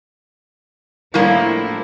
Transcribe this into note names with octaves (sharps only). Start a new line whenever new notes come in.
A2 F3 G3 A#3 D4 E4